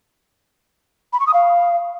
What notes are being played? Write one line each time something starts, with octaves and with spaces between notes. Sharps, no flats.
B5
C#6
D#6
F5